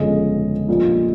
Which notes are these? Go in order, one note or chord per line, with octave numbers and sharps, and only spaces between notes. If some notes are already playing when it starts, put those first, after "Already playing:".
Already playing: G1 F2 C#3 G#3 C#4 D#5
A#1 A#2 G3